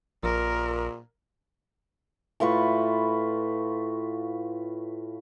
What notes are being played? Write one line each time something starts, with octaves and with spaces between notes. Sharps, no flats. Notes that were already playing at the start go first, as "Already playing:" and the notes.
A#1 A#2 A#4
A2 F4 B4 C#6